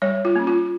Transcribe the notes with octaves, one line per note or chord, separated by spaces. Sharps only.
G3 C#5
F4
A#3 C#4
F4